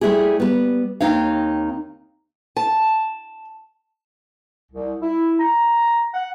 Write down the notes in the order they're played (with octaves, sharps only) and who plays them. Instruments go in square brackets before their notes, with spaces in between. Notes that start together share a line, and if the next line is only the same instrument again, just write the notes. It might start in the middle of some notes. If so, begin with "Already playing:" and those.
[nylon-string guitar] G3 A3 E4 G4 G#4
G3 B3
D#2 C#3 C4 D#4 C#5 F5
[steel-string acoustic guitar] A5
[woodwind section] C2
E4
A#5
F#5